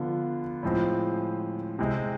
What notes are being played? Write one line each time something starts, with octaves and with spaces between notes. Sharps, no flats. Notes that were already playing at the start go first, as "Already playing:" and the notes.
Already playing: D3 F3 B3 F4
A2 F3 G#3 C4
C3 G#3 C4